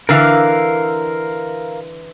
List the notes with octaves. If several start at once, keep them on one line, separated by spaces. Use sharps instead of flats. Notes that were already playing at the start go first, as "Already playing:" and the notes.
D3 E3 A#4 F5